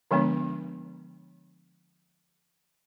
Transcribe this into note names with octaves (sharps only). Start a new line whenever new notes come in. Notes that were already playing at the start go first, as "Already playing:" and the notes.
D3 F3 G#3 B3 D4